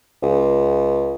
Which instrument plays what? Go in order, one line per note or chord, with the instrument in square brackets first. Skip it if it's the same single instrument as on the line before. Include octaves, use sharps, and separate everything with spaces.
[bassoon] C#2